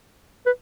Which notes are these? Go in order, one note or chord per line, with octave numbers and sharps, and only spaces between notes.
B4